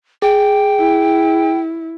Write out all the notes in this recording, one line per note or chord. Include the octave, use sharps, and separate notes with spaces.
G#4 G5
E4